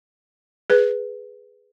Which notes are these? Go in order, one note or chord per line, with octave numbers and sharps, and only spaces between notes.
G#4 B4